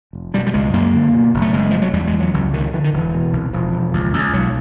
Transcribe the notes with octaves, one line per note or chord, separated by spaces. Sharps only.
F1
B2 G3
G3
C#2 G#3
F#2 A#3
D3
B2
F#1
A3
F#1 G#3
C3 F3
F#3
E2 G3
G#3
E2
F#3
C#2 F#3
C3 D#3
D3 E3
D#3
E1 E3
B2
C2
E1 F3
E1
C#2
C#2
B1 F#3